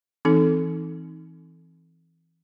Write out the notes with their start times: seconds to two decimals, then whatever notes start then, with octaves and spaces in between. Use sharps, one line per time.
0.25 E3 C4 D#4 A4